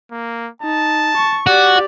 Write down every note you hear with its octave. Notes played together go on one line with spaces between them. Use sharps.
A#3
D#4 A5
C#6
F#4 G4 D5